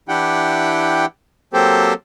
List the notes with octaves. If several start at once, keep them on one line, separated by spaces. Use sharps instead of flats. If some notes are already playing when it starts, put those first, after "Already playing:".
E3 D4 E4 G4 F#5 G5
F#3 A#3 C4 G4 A4 C5